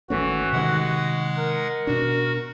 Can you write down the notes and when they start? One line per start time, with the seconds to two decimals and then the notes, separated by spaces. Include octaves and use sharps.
0.10 G#1 E3 A3 C#4 F#4
0.53 C3 D#3 G#3 F#5
1.38 A#4
1.87 B2 D4 F#4